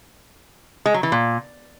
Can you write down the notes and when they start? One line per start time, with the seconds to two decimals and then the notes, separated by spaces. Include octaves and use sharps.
0.86 G#3
0.94 F#3
1.03 E3
1.12 A#2